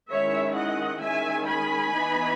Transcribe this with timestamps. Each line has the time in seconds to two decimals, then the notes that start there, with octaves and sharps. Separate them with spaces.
0.10 D#3 G#3 C#4 E4 C#5 E5
0.55 D#5 F#5
1.00 D#3 G#3 C#4 E5 G#5
1.46 G#5 B5
1.92 E3 B3 D#4